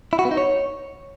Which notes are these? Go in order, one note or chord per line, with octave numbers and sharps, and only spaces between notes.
E4
F#4
B3
D#4
C#5